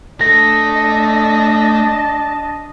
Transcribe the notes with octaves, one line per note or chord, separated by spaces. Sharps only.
A3 D4 A4 D#5 A5 A#6